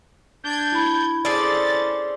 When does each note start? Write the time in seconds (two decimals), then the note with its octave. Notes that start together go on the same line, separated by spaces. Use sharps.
0.44 D4 D5 G6 G#6
0.72 E4 B5
1.25 C#4 G#4 A4 C5 D5 A6